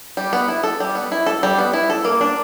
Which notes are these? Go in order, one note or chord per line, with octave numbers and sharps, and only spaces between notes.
G3
B3
E4
A4
G3
B3
E4
A4
G3
B3
E4
A4
A#3
D4